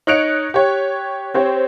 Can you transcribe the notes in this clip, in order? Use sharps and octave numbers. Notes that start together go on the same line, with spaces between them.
D#4 C#5 F#6 C#7 D7 F7
G4 C#5
C4 G4 C5 C#5